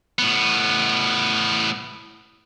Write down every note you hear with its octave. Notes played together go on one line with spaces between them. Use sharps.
A2 B3